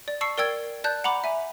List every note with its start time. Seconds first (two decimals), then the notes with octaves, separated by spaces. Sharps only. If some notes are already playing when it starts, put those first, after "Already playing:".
0.08 D5
0.21 A5 C#6 E6 C7 C#7
0.38 A#4 D5 G5 E6 G#6
0.84 D5 A5 F#6 G6
1.04 F#5 A#5 B5 D6
1.24 E5 G#5